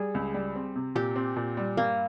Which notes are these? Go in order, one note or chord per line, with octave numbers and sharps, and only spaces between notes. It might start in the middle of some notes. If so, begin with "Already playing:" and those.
Already playing: G3 G#4
C#2
G3
C4
C3
A#2 G4
C4
A#2
G3
G2 A#3